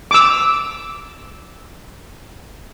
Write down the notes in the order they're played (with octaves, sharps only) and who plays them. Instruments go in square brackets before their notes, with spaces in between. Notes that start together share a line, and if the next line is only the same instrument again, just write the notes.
[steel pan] D6 E6